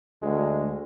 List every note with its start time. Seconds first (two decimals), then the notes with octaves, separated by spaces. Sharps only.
0.22 D2 G#3